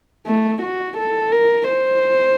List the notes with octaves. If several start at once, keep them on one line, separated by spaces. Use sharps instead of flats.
A3
F#4
A4
A#4
C5